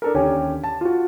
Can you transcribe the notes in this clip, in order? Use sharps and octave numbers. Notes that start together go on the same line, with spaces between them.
D4 A4 A#4
D#2 D3 C#4 G4 G#5
A5
F4 F#4